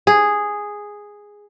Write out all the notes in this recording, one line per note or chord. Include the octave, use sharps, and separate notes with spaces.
G#4